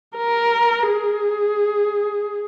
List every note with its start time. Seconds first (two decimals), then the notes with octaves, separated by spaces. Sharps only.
0.17 A#4
0.89 G#4